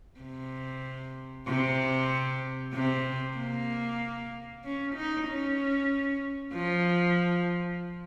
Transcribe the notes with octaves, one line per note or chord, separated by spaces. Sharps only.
C3
C3
C3
A#3
C#4
D#4
C#4
F3